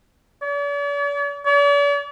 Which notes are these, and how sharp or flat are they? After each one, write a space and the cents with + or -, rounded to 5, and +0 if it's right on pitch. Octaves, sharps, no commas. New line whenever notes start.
D5 -45
D5 -45